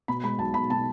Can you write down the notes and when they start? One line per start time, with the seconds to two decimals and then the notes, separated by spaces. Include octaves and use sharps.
0.08 B2 B5
0.23 G#3 B5
0.39 B1 A5
0.54 B1 B5
0.70 B2 A5